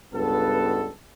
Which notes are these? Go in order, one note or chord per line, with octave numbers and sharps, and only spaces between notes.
C#2 G2 B3 A4